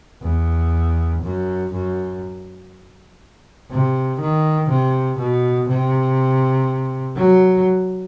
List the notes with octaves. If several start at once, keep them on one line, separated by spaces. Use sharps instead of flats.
E2
F#2
F#2
C3
D#3
C3
B2
C3
F#3